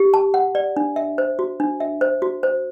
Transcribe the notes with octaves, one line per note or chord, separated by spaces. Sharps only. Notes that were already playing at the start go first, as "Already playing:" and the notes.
Already playing: G4
A5
F#5
D5
D4
E5
C5
F#4
D4
E5
C5
F#4
C5